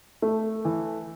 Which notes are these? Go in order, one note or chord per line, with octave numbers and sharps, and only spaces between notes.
A3
E3